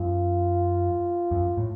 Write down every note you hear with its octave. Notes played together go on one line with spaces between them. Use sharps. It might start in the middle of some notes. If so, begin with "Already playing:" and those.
Already playing: F#2 F4
F#2
A2